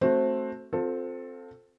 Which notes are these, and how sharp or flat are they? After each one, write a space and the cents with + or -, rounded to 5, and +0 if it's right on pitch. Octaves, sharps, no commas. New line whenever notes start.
A3 +0 C4 +15 F#4 +0
C4 +0 F4 +30 A4 +10